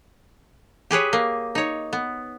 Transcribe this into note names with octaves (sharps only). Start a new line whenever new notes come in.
G4 G#4 B4 C#5
A#3
D#4 C#5
B3